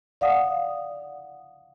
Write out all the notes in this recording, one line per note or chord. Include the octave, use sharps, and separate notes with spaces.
D5 F5 F#5 D#6